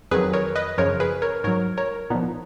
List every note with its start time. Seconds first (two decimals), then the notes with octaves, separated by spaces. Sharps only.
0.11 F2 D#3 F#3 G#4 B4
0.33 A#4 C#5
0.55 B4 D#5
0.78 F#2 C#3 F3 A#4 C#5
1.00 G#4 B4
1.22 A#4 C#5
1.44 G#2 F#3 A#4 C#5
1.77 A#4 C#5
2.10 A#2 B3 D#4
2.15 F3